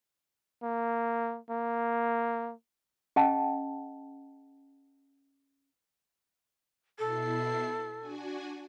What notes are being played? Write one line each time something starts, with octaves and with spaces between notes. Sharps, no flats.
A#3
A#3
C#4 G#4 D#5 F#5 G5 A5
B2 E4 A4 C7
D4 F#4 G#5